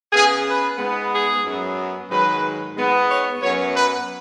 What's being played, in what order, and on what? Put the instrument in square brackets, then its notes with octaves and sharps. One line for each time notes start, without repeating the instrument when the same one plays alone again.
[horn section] C#3 B3 G#4
B4
G#2 G#3 B3
G#4
F#2 F#3 B3
G#2 D#3 F#3 B4
G#2 G#3 B3
C#5
F#2 F#3 B3 C#5
B4